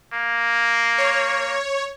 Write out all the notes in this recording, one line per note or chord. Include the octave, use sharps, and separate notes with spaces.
A#3
C#5